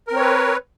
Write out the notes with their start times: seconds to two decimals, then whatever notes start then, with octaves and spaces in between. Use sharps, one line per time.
0.07 A#4
0.12 C4
0.16 C#5
0.20 B4